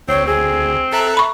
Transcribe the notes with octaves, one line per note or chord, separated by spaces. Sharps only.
D2 C4 C#5
C4 G#4
A4 E5 A#5 F#6
B5 C#6